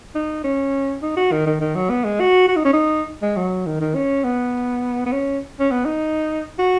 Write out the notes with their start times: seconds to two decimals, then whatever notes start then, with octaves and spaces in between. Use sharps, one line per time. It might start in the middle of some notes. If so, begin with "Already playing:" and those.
0.15 D#4
0.44 C#4
1.02 D#4
1.17 F#4
1.32 D#3
1.47 D#3
1.61 D#3
1.75 F#3
1.90 B3
2.04 G#3
2.20 F#4
2.48 F#4
2.56 D#4
2.65 C#4
2.73 D#4
3.22 G#3
3.37 F#3
3.66 D#3
3.81 D#3
3.95 C#4
4.24 B3
5.06 B3
5.12 C#4
5.60 C#4
5.71 B3
5.85 D#4
6.59 F#4